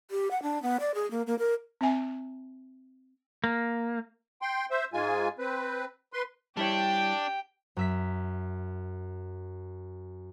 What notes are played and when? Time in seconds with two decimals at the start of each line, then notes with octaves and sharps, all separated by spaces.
0.11 G4
0.31 F#5
0.42 D4
0.63 B3
0.80 D5
0.94 G#4
1.11 A#3
1.27 A#3
1.39 A#4
1.81 C4 E5 G#5
3.44 A#3
4.42 G5 C6
4.71 C5 E5
4.93 G#2 G#3 F4 G#5
5.39 C4 B4
6.13 B4 C6
6.57 G3 D4 E4 G4 C#5 G5
7.77 F#2 E5 B6